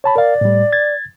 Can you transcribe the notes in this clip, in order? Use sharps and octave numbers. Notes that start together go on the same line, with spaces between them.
C#5 A5 B5
A#4 D5 F5
A2 G3
G#6 A6